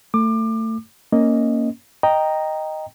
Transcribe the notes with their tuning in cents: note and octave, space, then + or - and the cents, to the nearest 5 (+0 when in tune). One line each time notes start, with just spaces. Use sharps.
A3 +25 D6 +30
A#3 -5 C#4 +0 D#5 +0
D#5 +0 G5 +0 A#5 +0